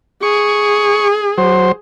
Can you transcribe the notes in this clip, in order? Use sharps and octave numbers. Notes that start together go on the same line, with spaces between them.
G#4 C#6
F#3 C5